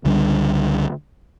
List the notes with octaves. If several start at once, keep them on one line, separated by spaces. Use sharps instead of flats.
C#2 D3 G3 D4